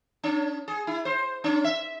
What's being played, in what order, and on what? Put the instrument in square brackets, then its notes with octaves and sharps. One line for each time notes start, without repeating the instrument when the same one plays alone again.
[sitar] C#4
G#4
E4
C5
C#4
E5